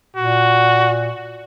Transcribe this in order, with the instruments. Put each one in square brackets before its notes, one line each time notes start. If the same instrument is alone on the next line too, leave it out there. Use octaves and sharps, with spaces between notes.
[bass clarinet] A#2 [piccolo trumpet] F#4